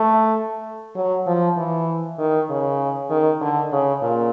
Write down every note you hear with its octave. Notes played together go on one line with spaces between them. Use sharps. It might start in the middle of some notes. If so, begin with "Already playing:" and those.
Already playing: A3
F#3
F3
E3
D#3
C#3
D#3
D3
C#3
A#2